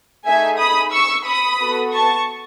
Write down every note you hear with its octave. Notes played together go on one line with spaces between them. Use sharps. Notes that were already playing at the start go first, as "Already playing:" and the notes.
A3 D#4 G#4 E5 G#5
B5 D#6
C#6 E6
B5 D#6
B3 F#4 A4
A5 C#6